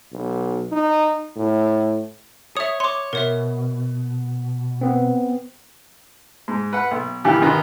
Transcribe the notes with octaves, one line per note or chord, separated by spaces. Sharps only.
B1
D#4
A2
C#5 E5 D#6
C#5 C6 D6
B2 A#4 C#5 E5
B3 C4
G#2
B4 F#5
B1
D#3 E3 G3 F4 G4
A#1 D#3 D#4 B4